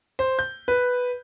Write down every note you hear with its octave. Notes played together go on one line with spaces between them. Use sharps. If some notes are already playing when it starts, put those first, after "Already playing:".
C5
G6
B4